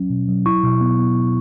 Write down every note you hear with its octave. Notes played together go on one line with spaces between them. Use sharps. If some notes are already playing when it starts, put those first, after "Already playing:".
Already playing: F#3 C#4
B2
F#3
E4 C#6
B2
B3
B3